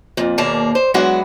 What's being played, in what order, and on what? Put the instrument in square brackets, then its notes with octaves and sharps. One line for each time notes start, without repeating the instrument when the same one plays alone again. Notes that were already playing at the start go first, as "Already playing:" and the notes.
[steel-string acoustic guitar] F2 A#2
D#2 B2 A#3 G#4 D5 A5
C5
F#3 G#3 B3 D4 E4 F#4